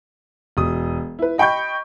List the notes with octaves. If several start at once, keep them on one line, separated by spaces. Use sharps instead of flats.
E1 D#6
E4 B4
D#5 G5 B5 C#6 G6